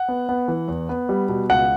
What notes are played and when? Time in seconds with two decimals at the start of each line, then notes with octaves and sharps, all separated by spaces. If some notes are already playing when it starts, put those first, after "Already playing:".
Already playing: F#5
0.08 B3
0.29 B3
0.48 E3
0.68 E2
0.89 B3
1.09 G3
1.29 B2
1.50 C#2 F#5